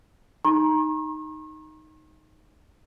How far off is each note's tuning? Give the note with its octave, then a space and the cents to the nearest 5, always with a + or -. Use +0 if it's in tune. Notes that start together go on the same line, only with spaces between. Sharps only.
D#4 +0 A#5 +20 C#6 -45